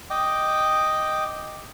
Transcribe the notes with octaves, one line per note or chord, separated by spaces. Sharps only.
D#5 G5 D6